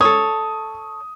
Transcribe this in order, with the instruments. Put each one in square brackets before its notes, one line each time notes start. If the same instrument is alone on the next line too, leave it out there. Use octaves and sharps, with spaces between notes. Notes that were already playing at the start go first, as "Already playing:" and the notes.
[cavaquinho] A4 C#5 [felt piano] D#6